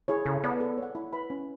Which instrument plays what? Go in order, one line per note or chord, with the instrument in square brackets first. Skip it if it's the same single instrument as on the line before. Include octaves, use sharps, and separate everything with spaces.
[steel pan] E4 G#4 C#5
[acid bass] C#3 [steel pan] A4
[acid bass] B3 [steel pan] D5 A5
[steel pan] A4
C#5
F#5
E4
B4 E5 B5
C#4